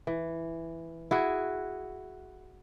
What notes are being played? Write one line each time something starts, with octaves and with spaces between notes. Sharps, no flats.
E3
E4 F#4 G#4